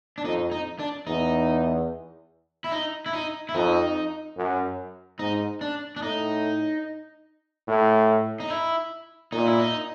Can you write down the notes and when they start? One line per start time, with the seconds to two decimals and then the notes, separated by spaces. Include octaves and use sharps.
0.18 D4
0.24 F2 D#4
0.52 D#4
0.79 D4
1.07 E2 D#4
2.64 E4
2.72 D#4
3.06 E4
3.13 D#4
3.49 E4
3.54 F2 D#4
4.37 F#2
5.19 G#2 D#4
5.61 D4
5.96 D4
6.02 A2 D#4
7.68 A2
8.40 D#4
8.50 E4
9.32 A#2 D#4
9.47 E4
9.59 D#4